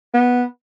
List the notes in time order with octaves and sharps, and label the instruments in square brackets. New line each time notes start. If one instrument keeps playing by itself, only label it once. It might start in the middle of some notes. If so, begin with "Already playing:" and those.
[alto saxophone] B3